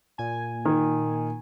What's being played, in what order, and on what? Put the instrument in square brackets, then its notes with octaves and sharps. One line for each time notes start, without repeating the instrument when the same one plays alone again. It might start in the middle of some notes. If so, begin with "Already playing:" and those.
[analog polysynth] A#2 G#5
[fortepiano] D#3